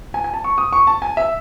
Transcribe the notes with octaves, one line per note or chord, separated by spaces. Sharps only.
G#5
G#5
A5
C#6
D#6
C#6
A5
G#5
E5